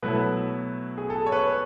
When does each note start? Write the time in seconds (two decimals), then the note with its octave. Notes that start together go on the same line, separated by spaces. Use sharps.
0.03 B2 F#3 A3 E4 B4
0.98 G#4
1.10 A4
1.26 C#5
1.32 B4